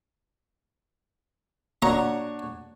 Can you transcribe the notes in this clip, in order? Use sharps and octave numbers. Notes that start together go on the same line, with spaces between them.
A#3 D4 F#4 C#5 A#5